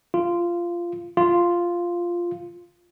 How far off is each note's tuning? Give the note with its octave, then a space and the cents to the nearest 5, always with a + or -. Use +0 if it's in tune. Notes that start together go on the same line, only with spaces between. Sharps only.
F4 -15
F4 -5